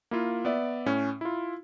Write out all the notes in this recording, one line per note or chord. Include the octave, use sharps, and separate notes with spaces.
A#3 E4 F4
B3 D5 E5
A2 C#4
E4 F4